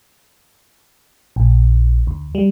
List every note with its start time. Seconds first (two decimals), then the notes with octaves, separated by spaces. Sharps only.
1.36 A#1
2.07 D2
2.35 G3